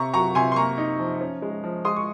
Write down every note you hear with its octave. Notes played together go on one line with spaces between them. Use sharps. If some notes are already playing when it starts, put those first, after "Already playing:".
Already playing: C3 A#5 C#6
F#3 A#5 C#6
C3 G#5 C6
C6
A#3 A#5 C#6
D#4
F3
C#4
G#3
F3
G#3 C6 D#6
C#6